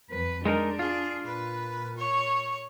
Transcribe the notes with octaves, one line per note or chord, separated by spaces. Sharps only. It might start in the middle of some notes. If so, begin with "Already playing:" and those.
F2 B4
G#3 D4 D#4 A#4
F4 G#4
A#2 B4
C#5